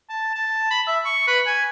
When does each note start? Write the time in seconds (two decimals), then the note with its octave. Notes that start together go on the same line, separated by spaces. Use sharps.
0.10 A5
0.35 A5
0.71 B5
0.87 E5
1.05 C#6
1.28 B4
1.46 G#5